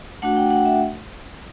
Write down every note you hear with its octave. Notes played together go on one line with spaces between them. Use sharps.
A3 D4 F#4 F#5
G5
F#5
E5